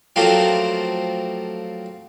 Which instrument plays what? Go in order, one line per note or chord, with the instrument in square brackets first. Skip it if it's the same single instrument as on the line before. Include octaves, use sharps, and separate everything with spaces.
[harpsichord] F3 F#3 A3 A#3 C4 F4